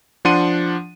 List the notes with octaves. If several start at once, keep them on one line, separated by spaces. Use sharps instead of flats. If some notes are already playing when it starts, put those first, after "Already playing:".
F3 D4 F#5 C6 D#7